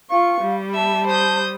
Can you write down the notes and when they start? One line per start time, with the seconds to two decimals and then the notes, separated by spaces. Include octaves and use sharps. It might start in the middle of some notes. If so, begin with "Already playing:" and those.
0.10 F4 F5 C#6
0.41 G3
0.75 E5 A5
1.08 C5 D#6 G6